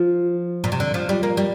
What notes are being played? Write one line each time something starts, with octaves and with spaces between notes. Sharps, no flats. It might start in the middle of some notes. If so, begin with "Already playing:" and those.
Already playing: F3
A#2
C3
D3
F3
G3
A#3
G3